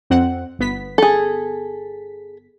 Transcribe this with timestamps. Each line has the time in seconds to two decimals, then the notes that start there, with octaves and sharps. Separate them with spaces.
0.10 F2 C4 F#5
0.59 G1 B3 B6
0.98 G#4 A4